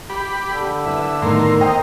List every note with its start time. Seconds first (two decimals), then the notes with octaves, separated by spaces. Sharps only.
0.10 G4 B5
0.48 D3
0.86 E4 B4 E5
1.22 A2 D#3 B3 A#5 C6
1.61 C5 D#5 G5 A#5